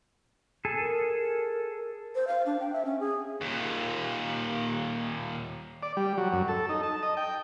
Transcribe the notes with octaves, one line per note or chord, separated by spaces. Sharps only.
G#4 A4
A#4
C5
F5
D4
G5
E5
C#4
G#4
D#2 A#2
D5
G3
F#3
F#2
A4
D#4
A5
D#5
G5